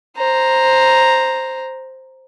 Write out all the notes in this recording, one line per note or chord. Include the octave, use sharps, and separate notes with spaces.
C5 A#5